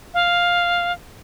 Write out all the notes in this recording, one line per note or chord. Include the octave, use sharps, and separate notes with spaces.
F5